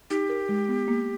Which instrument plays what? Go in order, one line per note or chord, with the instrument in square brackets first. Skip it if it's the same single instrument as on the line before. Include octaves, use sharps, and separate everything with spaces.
[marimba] D#4 [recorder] G4
[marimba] A#4
G#3
B3
A#3